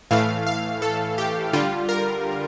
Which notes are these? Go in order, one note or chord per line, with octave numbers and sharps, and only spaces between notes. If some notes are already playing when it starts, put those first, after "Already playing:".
A2 E3 A3 F5
F5
A4
G4
D3 G3 F4
A#4